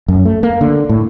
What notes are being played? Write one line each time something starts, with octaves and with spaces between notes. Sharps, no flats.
F#2
A3
A#3
D3
A2